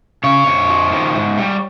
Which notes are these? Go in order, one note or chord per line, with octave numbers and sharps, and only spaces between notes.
C#3 C#5
F2
F3
D#3
G#2
G3